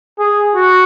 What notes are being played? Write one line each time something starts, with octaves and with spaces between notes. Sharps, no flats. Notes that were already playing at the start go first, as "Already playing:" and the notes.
G#4
F#4